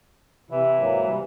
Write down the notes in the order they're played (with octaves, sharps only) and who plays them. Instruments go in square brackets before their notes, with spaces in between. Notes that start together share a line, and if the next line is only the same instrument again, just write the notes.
[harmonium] C3 E4 [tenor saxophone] E3
[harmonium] G#2 F#3 A#3
C3 G3